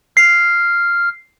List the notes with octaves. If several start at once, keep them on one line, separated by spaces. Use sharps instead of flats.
F6 C7